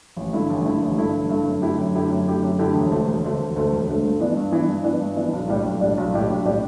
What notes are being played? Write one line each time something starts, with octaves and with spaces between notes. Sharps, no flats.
A1
G2 D3 A3 E4
A1
G2 D3 A3 E4
A1
G2 D3 A3 E4
A1
G2 D3 A3 E4
F#2
D3 A3 E4 G4
F#2
D3 A3 E4 G4
F#2
D3 A3 E4 G4
F#2
D3 A3 E4 G4
E1
D2 D3 A3
E1
D2 D3 A3
E1
D2 D3 A3
E1
D2 D3 A3
G2
E3 B3 D4
G2
E3 B3 D4
G2
E3 B3 D4
G2
E3 B3 D4
B1
A2 G3 D4 G4
B1
A2 G3 D4 G4
B1
A2 G3 D4 G4
B1
A2 G3 D4 G4